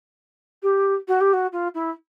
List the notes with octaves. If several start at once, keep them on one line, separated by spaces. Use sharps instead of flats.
G4
F#4
G4
F#4
F4
E4